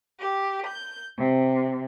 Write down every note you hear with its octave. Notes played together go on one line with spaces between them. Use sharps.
G4
G6
C3